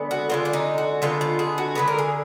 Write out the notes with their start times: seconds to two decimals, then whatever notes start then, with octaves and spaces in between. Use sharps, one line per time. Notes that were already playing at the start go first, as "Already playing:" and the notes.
Already playing: D3 G#3 B3
0.11 F#4
0.30 D3 G#3 B3 F4
0.45 D4
0.53 D#4
0.78 F#4
1.02 D3 G#3 B3 F4
1.21 F4
1.39 G#4
1.58 F#4
1.75 D3 G#3 B3 B4
1.88 A#4
1.99 G#4